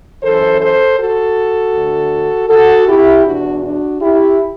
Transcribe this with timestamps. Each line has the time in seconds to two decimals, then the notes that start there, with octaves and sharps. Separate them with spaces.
0.23 F#2 E3 A4 C5
0.60 A4 C5
0.98 F#4 A4
1.74 D2 D3
2.49 F#4 A4
2.87 E4 G4
3.25 E2 B2 D4 F#4
3.62 D4 F#4
4.01 E4 G4